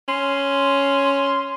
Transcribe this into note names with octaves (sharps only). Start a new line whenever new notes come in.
C#4 C6